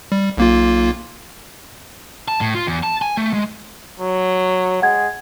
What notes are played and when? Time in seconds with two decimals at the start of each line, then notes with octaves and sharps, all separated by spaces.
0.12 G3
0.37 B1 A#3 F4
2.28 A5
2.41 A2
2.55 F4
2.67 E2
2.83 A5
3.02 G#5
3.17 A3
3.33 G#3
4.00 F#3
4.82 G#3 F#5 G#6